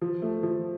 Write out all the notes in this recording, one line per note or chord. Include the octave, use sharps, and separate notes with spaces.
F3
A3
F3